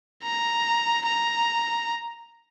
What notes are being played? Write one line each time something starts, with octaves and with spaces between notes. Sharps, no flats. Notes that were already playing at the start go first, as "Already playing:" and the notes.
A#5
A#5